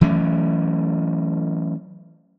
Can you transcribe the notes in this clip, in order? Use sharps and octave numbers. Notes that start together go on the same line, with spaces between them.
E3 F#3 A3 C#4